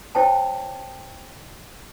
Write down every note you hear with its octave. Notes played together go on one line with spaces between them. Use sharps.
E4 C5 C#5 G5 A5